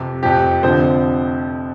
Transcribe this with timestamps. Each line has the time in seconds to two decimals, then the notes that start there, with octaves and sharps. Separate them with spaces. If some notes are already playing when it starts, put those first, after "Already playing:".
Already playing: F2 C3
0.23 F1 F2 C3 F3 G4
0.63 F1 F2 D3 F3 C5